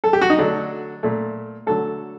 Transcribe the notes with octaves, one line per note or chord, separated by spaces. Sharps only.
A4
G4
F#4
D#4
D3 F#3 A3 D4
A#2 A3
D3 F#3 A3 A4